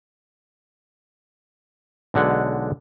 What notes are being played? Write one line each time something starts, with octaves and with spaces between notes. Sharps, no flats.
B1 D3 G#3 F#5